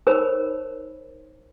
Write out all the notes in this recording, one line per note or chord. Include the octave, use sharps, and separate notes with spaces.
D#4 A#4 C5 C#5 B5